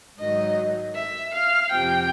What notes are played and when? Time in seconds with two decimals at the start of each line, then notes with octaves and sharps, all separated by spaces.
0.19 G#2 D#3 F#3 D#5
0.95 E5
1.33 F5
1.71 F2 C3 F3 G5